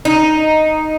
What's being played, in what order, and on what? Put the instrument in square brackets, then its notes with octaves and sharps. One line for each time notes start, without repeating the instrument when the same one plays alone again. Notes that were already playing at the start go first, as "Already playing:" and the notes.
[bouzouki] D#4